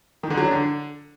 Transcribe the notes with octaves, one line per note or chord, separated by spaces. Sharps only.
D#3
D3
F#3
D4
D3